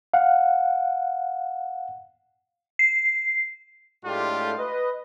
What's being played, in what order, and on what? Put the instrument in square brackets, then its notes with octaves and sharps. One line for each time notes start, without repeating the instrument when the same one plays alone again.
[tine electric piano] F5 F#5
[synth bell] C7
[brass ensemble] A2 G#3 A3 D4 F4 G4
B4 D#5